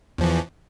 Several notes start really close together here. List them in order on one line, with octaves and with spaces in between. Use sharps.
E2 F3 E3